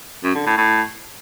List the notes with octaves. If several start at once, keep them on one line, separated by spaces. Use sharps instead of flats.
F#2
D3
A2
A2